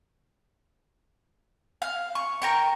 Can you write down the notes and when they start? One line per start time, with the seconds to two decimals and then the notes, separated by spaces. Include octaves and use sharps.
1.82 F5
2.15 C#6
2.42 A#4 G5 C#6